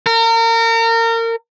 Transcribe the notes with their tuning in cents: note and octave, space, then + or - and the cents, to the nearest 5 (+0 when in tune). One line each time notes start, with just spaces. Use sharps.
A#4 -30